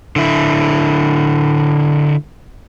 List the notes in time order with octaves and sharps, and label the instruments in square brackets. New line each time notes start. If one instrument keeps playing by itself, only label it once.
[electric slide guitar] D3 E4